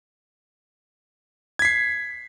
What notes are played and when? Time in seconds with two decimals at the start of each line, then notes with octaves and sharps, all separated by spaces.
1.59 G#6
1.62 B6
1.65 C7